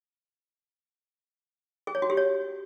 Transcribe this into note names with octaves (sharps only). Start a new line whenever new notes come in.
G#4
C#5
F#4
G4
C#5